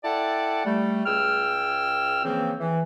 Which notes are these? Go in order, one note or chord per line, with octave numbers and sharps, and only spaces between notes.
E4 A4 D5 F#5 G5 A5
G3 A3
C#2 G#4 G5 E6 F6
C#3 E3 F3 A#3 C4
E3